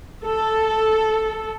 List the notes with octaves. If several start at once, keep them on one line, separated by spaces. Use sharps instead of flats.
A4